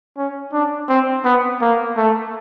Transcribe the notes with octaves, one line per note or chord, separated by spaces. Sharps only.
C#4
D4
C4
B3
A#3
A3